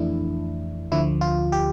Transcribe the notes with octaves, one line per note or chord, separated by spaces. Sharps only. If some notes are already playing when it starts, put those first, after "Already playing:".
Already playing: F2 E3 A3 D4 E4
D2 D3 F3 E4
F4
G4